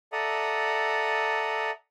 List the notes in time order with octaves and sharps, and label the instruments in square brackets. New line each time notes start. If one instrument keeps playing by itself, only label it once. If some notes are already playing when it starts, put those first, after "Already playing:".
[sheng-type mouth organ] A4 D5 E5 F#5 A#5 D#6